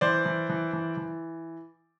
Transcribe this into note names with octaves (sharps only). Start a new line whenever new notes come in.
E3 C5 D5
E3
E3
E3
E3